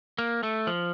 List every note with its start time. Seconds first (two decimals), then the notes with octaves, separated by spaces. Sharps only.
0.18 A#3
0.43 A3
0.67 F3